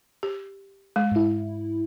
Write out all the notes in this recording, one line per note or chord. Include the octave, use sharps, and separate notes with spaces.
G4
G#3
G#2 E4